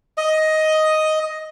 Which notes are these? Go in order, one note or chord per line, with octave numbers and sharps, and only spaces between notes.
D#5